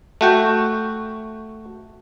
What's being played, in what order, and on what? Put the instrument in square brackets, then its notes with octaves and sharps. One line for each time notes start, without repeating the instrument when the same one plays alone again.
[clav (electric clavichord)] A3 F#4 G5